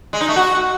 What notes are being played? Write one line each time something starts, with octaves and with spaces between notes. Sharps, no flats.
G#3
D#4
A3
F#4